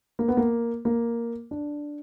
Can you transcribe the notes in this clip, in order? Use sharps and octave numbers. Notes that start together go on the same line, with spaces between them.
A#3
B3
A#3
A#3
D4